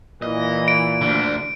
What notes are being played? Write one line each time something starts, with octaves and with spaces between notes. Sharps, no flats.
A#2 E3 D#5
D7
D2 D3